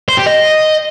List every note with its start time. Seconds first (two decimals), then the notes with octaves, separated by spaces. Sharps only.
0.09 C5
0.17 G4
0.26 D#5